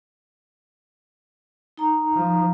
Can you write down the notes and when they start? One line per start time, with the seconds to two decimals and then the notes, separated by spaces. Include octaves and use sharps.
1.78 D#4 A#5
2.13 F3